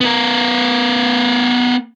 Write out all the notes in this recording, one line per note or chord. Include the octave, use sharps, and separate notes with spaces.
B3 A#4